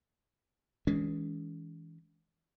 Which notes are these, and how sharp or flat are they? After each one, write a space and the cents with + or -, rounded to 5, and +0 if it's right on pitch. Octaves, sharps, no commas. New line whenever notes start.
E3 -25 G#3 +0 C#4 +40